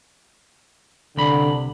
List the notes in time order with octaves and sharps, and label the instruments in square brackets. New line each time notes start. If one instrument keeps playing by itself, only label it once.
[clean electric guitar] C2 B5 [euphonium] D3